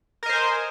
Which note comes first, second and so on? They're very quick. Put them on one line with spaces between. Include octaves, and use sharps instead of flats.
A#4 D#5 C5 G#5